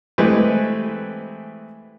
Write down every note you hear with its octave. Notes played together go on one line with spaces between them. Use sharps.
E3 G#3 A3 C4 G4 B4